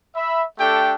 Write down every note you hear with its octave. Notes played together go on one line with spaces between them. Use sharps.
E5 B5
A3 D4 G4 A4 G5